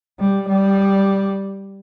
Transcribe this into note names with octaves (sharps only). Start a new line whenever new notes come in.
G3
G3